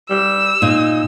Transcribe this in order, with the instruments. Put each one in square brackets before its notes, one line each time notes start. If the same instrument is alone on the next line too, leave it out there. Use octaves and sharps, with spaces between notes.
[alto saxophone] G3 [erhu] E6
[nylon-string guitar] A#2 [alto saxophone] D#4